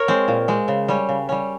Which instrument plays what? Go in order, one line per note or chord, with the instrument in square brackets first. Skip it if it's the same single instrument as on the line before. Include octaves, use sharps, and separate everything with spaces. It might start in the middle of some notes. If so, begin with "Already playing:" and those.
Already playing: [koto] A#4 C#5
G#3 C4
A#2
G#3 C4
C#3
G3 C#4
C#3
G3 C#4